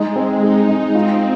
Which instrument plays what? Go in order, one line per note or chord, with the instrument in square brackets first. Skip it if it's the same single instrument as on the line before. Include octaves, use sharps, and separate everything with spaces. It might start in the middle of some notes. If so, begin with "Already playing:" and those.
Already playing: [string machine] G#3 [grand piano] D#4
[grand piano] C4
[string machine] D#4 [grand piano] G#4
[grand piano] G#3
[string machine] C4 [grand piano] F4